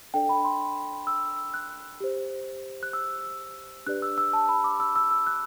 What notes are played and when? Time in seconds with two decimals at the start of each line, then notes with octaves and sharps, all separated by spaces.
0.14 D4 A4 D5 G5
0.29 B5
0.45 C6
1.07 E6
1.54 F#6
2.00 G4 C5
2.83 F#6
2.93 E6
3.86 D4 G4 B4 D5 F#6
4.02 E6
4.18 E6
4.33 A5
4.49 B5
4.64 D6
4.80 E6
4.96 E6
5.11 E6
5.27 F#6